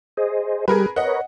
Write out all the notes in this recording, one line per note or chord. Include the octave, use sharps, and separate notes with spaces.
G#4 C5 D#5
G3 G4 G#4 A#4 B4
A#4 B4 C#5 D#5 F#5